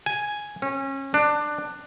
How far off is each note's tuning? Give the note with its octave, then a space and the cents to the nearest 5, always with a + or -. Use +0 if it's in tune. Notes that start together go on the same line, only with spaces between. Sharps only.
G#5 +0
C#4 -30
D4 +15